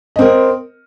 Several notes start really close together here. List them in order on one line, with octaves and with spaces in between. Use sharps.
D#5 C4 A#4